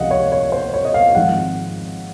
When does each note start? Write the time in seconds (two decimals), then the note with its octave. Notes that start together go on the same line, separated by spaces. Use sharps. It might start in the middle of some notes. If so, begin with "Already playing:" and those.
Already playing: C#2 C3 F3 D#5 F5 F#5
0.11 C#5
0.32 C#5
0.52 C5
0.74 C#5
0.85 D#5
0.94 F5
1.15 G#1 G#2 F3 G#3 C4 F#5